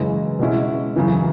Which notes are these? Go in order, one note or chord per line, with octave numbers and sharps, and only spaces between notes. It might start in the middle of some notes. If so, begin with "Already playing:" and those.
Already playing: F#2 C#3 E3 G#3
B2 G#3 C#4 E4
F#2 C#3 E3